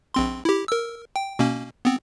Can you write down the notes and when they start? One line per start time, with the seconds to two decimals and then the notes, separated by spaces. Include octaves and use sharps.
0.14 A#1 C4 C6
0.45 E4 G4
0.68 A#4 E6
1.16 G5
1.39 B2 A#3 C#4
1.85 B3 C4